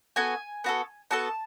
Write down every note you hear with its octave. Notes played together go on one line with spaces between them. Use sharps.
B3 F#4 A4 G#5
B3 F#4 A4
B3 F#4 A4 A5